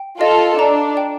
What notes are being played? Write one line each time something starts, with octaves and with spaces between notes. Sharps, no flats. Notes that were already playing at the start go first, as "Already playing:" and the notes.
Already playing: G5
F4 A4 D#5
D4 A#5
G5